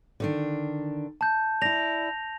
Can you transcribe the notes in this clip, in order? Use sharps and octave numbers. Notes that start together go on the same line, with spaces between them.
D3 D#3 D4
A5 G6
E4 D5 A#6 F7